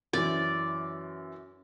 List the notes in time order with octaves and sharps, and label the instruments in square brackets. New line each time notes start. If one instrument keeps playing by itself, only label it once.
[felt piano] F#2 E3 [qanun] D5